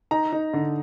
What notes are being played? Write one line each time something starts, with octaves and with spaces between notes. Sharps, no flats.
D#4 A#5
D#4
D3